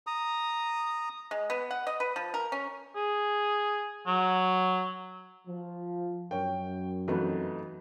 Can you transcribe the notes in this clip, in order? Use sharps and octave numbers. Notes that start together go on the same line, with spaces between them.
A#5 D#6
G#3
B3
F#5
D#5
B4
F3
A#4
C#4
G#4
F#3
F3
F#2 A#4 C#5 G5
F2 E3 A3 D#4 F#4 B4